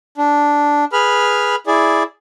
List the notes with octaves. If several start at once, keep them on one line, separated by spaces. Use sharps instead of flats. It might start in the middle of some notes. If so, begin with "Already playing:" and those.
D4
G#4 B4 B5 F6
E4 G#4 D5